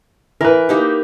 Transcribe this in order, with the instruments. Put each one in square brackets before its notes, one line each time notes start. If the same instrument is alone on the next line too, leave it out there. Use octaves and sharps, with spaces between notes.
[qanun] E3 [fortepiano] A#4 B4
[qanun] A#3 D#4 G4